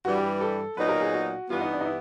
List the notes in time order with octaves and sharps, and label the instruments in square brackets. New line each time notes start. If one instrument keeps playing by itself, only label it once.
[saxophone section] G2 E3 G3 [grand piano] F#4
[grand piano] G4
A4
[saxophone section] A#2 F#3 B3 D#4 [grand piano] B4
[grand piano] A#4
G#4
F#4
[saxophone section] G2 E3 G3 B3 [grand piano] F4
[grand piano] D#4
D4
D#4
E4